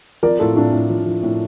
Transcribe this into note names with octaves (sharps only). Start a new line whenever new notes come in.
F3 A#4 D5
A2 F4 A4
A2 D4 F4
A2
F3
F3
A2